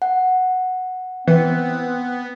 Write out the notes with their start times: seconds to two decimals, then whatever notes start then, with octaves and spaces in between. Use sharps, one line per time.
0.02 F#5
1.28 E3 B3 C4